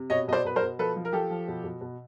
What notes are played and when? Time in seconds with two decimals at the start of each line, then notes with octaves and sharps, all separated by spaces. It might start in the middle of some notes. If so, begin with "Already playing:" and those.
Already playing: C3
0.10 B2 C#5 D#5
0.28 B2 D#5
0.33 C5 D5
0.45 B2 B4
0.56 A#4 C5
0.62 B2
0.79 F3 A4 B4
0.96 F3
1.05 A#4
1.13 F3 G4 A4
1.30 F3
1.48 B2
1.64 B2
1.81 B2